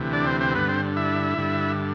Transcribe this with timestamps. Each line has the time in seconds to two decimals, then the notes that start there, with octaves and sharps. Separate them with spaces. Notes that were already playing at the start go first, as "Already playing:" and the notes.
Already playing: D2 C3 E3
0.13 D4 D5
0.26 C4 C5
0.41 C4 C5
0.55 G2 D3 B3 B4
0.68 C4 C5
0.97 E4 E5
1.38 G2 D3